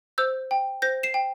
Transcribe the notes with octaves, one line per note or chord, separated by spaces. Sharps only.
C5 E6 G6
G5
C5 G6 A#6
C7 E7
G5